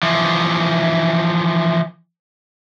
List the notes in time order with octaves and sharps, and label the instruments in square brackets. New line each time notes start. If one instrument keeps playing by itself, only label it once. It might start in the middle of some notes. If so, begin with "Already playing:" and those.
[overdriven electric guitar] E3 F3